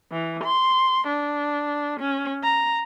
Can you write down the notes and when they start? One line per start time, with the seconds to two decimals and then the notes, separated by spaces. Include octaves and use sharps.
0.11 E3
0.44 C6
1.07 D4
2.00 C#4
2.43 A#5